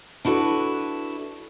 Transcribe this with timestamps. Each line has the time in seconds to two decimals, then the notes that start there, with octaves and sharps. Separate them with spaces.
0.25 D4 E4 F#4 A4 B4